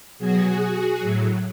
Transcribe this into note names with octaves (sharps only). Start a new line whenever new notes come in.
B2 F#3 F#4 G#4
A2 F#3